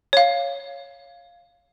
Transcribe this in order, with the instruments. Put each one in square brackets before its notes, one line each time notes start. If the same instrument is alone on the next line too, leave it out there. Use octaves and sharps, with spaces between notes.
[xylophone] C#5 F5